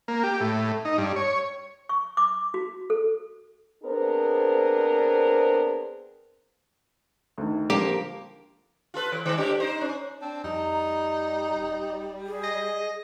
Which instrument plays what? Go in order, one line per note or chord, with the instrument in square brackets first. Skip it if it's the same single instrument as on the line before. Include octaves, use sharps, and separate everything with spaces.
[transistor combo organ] A#3
G4
A2
D#4
G2
C#5
[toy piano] C#6
D6
F#4
A4
[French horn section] B3 C4 D4 G#4 A#4 C5
[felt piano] D2 D#3
[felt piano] D3 F3 [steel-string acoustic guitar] A#3 [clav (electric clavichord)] G4
[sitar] F4 A4 B4
E3
D#3 G#3
A2 D4 G4
D#4 C5
C#4
[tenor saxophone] C4 [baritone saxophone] D4
[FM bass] F2 [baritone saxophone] G3 [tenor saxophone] D#4 [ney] A#5
[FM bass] D#1
[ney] G#4
[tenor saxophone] D#5